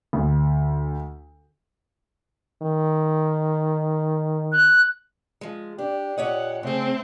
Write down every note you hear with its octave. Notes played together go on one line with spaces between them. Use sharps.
D2
D#3
F#6
F3 G#3
D4 G4
A#2 G4 C#5 D#5 F#5
C#3 A3 C4 G#4